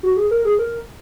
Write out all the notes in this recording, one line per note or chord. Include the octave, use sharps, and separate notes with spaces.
F#4
G#4
A#4
G#4
A#4